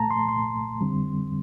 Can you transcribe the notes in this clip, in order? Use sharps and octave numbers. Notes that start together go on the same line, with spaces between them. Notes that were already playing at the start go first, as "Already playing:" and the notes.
Already playing: C2 A#2 A3 A5 A#5
C6
C2 A#2 A3 C6
F2 D3 G3 C4